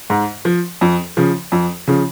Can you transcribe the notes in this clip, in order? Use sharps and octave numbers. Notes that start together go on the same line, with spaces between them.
G#2
F3
F2
C#3 F3
F2
C#3 F3